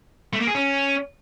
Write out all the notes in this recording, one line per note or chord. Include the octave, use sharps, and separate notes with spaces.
A3
A#3
G#4
C#4